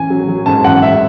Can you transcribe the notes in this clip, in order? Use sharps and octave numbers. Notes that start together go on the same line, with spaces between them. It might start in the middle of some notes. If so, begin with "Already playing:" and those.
Already playing: A1 G#5
F#3
F#3
G#2 A5
A1 F#5
G#2 E5